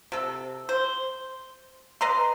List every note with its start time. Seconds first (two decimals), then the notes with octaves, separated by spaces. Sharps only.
0.12 C3 A4
0.69 C5
2.01 B4 D#5 A#5 C6